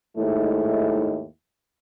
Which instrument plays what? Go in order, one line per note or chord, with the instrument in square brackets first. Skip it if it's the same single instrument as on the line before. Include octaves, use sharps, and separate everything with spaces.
[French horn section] D#2 G#2 A3 E4